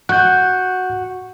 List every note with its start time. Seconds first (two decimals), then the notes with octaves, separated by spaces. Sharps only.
0.09 F#4 F#6 G6